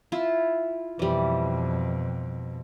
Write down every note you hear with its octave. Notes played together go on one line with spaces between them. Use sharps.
E4 F4
F2 B2 E3 G3